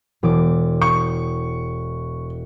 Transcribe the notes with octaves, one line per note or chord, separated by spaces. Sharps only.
E1 D6
C#6 C#7